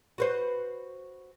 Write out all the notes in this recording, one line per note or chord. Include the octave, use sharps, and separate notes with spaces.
F#4 B4 C5